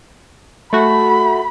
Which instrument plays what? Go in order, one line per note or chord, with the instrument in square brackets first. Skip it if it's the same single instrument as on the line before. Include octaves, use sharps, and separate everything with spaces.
[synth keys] A3 F#4 [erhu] B5